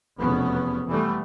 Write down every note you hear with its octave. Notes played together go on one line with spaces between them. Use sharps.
F1 E2 B2 B3 C#4
E3 G3 A3 B3